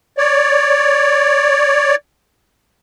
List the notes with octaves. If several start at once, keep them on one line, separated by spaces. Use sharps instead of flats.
C#5 D5